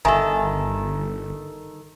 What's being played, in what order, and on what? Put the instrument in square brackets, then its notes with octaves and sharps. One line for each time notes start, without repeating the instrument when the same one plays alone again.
[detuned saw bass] G1 [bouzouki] D#3 A4 [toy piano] E5 G#5 A#5